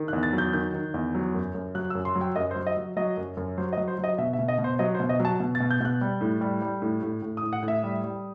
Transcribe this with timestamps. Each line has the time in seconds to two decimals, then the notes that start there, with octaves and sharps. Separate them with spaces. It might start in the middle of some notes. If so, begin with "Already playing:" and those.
Already playing: D#3
0.08 F#6
0.13 E2
0.23 A6
0.33 F#3
0.38 G6
0.53 D#3 G6
0.74 D#3
0.94 E2
1.15 F#3
1.34 F#2
1.55 F#2
1.75 F#3 F#6
1.90 E6
1.95 F#2
2.05 C6
2.15 F#3
2.21 G5
2.36 F#2 D#5
2.51 C5
2.56 F#3
2.67 D#5
2.77 F#3
2.97 F#3 D#5
3.17 F#2
3.37 F#2
3.57 F#3 C5
3.73 D#5
3.77 F#3
3.88 C5
3.98 F#3
4.04 D#5
4.18 B2 E5
4.33 E5
4.39 B2
4.48 D#5
4.58 B2
4.64 C5
4.79 F#3 D#5
4.95 C5
5.00 B2
5.09 D#5
5.20 F#3
5.25 A5
5.40 B2
5.55 A6
5.60 B2
5.71 G6
5.80 B2 F#6
6.01 G3
6.21 A2
6.41 G3
6.62 G3
6.82 A2
7.02 A2
7.22 A2
7.37 D#6
7.42 A2
7.53 F#5
7.62 A2
7.68 E5
7.83 G3
8.04 G3